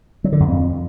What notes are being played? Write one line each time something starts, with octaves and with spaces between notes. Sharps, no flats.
F#3
D3
F#2
F2